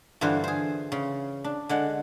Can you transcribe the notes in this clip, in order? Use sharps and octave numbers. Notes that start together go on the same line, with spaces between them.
G2 D3 E3 F4 C5
G#4 C5
C#3
D4
D3 G#3 F#5